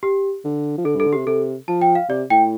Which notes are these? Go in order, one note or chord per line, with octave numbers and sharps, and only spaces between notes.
G4
D3
F3
D3 A4
G2
A4
D3
G4
C3
C3 A4
F3 A5
G5
F5
C3 D5
A2 G5